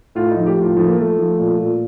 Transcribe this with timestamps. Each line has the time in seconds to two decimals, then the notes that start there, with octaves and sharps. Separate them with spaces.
0.15 A2 F4
0.31 D#4
0.36 F3
0.46 G4
0.57 A2
0.62 F4
0.77 F3 A3
0.87 A#3
0.97 F3 A3
1.18 F3
1.39 A#2
1.58 A#2